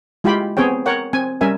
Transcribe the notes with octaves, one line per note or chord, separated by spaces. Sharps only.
G#3 E4 F4 G4 G5 B5
B3 C4 G#4 C#5 G5
A#4 C#5 F#5 G5
C4 G#5
G3 C#4 A#4 E5 G#5